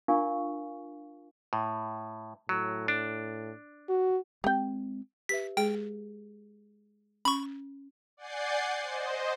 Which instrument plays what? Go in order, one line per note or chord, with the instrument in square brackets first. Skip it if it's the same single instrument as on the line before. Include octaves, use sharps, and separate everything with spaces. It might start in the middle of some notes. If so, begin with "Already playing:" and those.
[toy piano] D4 F4 A#4 F5 G#5 C#6
[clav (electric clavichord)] A2
[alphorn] A2 [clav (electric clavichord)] F#3
[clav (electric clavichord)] D4
[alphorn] F#4
[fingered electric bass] G#3 C4 [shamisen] G4 G5
[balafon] G4 B4 E5 [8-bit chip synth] B6
[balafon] G#3 G#4 [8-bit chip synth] G5
[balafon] C#4 [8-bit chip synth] B5 C#6
[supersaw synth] D5 F#5 G#5 G6 A6 C7
C5 D#5